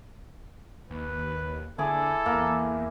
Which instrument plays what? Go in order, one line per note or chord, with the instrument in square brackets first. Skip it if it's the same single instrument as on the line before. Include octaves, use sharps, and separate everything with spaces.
[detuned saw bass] D#2 [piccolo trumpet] B4
[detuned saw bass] D3 [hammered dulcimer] E4 G#4 D6 [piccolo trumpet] A4
[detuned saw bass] E2 [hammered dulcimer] A#3